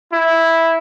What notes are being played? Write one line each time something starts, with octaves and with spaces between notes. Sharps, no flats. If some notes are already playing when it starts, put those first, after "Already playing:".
E4